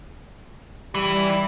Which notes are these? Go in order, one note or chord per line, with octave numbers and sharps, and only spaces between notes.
E3 G3